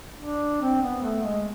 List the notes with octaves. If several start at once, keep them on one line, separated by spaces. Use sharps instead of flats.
D4
C4
B3
A3
G#3